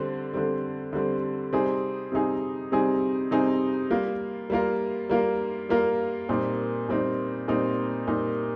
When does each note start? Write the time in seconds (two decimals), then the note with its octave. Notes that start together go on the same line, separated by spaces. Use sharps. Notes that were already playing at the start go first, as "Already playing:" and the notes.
Already playing: D3 G3 C4
0.34 D3 G3 C4
0.93 D3 G3 C4
1.53 C3 G3 C4 D#4 G#4
2.12 C3 G3 C4 D#4 G#4
2.72 C3 G3 C4 D#4 G#4
3.31 C3 G3 C4 D#4 G#4
3.90 G3 A#3 F4 A#4
4.50 G3 A#3 F4 A#4
5.09 G3 A#3 F4 A#4
5.69 G3 A#3 F4 A#4
6.29 A#2 G3 C4 D#4
6.89 A#2 G3 C4 D#4
7.48 A#2 G3 C4 D#4
8.07 A#2 G3 C4 D#4